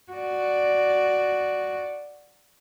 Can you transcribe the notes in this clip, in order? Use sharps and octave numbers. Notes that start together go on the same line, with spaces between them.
F#4 D5